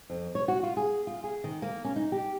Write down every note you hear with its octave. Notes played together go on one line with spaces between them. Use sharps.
F2
C#5
F#4
F4
G#4
F4
G#4
D#3
A#3
C#4
D#4
G4